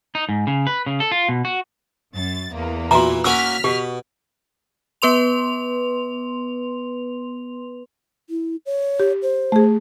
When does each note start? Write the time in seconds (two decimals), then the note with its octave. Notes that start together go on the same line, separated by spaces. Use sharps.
0.15 D#4
0.29 G#2
0.47 C#3
0.67 B4
0.86 C#3
1.00 A4
1.11 F4
1.29 B2
1.45 F#4
2.14 F#2 A6
2.53 E2 A#3
2.91 A#2 E3 F#4 A#5
3.24 A#3 C#4 F#4 E6 F6 B6
3.64 B2 G4
5.02 B3 B4 C6 F7
8.30 E4
8.66 C#5
9.00 G4
9.22 C5
9.52 A3 G#4